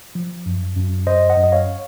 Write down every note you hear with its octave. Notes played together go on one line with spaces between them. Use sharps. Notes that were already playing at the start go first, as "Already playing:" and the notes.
F3
F#2
F#2
F#2 C5 D#5
D#5 F#5
F#2
D#5
C#5 F5